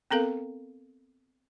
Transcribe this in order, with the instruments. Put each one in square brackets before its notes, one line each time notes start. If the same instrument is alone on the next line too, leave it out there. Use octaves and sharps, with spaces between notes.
[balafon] B3 C4 A4 A#4 F5